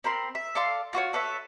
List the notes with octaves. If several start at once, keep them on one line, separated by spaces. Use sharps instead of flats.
C4 A#4 B5 C6
E5
A4 D5 F5 C6
F4 F#4 C5 C#5
A4 B4 C#5 E5